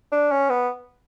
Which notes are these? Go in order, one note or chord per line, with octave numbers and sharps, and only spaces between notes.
D4
C#4
B3